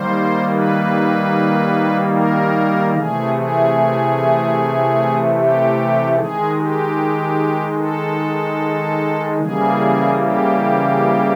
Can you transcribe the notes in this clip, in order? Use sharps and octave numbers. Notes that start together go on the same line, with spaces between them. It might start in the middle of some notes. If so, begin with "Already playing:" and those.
Already playing: D#3 G3 A#3 C5
B4
A#4
C3 E3 A3 G#4
G#4
G4
D#3 G#3 G#4
G4
A4
C#3 E3 G3 A#3 G#4
G4